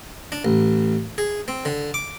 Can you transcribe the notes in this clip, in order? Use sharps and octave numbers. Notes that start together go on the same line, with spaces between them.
D4
A1
G#4
C4
D3
D6